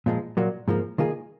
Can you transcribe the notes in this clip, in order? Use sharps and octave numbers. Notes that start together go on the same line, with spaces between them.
A#2 F3 G#3
A#2 F#3 A#3
G#2 F3 A#3
D#3 A#3 F4 G#4